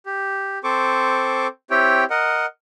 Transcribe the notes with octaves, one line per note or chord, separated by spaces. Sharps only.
G4
C4 A4 C5 C#6 D6
C4 E4 G4 C#5 G5
A#4 D#5 F#5